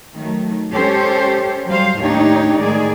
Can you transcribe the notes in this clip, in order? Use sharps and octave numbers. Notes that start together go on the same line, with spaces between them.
D#3 F#3 A3
G#3 C#4 G4 A4 C5 C#5
F#3 G3 C5 F5
D#2 A2 D4 D#4 G4 C#5
A2 D#3 G#3 G#4 D5